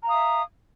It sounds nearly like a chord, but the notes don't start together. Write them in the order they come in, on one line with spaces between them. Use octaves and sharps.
A#5 F5 D#6 E5